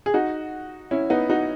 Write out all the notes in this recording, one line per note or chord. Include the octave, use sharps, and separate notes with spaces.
G#4
D#4 F#4
C#4 E4
B3 D#4
D#4 F#4